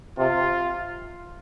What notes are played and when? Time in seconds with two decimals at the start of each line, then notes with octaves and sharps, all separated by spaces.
0.18 C3 F4